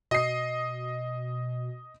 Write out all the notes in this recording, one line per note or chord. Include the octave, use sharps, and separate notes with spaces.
B2 D#5 C7